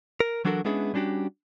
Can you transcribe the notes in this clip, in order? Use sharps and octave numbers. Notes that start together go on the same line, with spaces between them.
A#4
E3 F#3 D4 F#4 A4 A#4
G#3 B3 C#4 D4 E4 G#4
G3 C#4 D4 F#4 G4